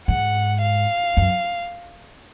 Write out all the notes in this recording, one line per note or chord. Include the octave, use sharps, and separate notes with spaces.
G#2 F#5
F5
F#2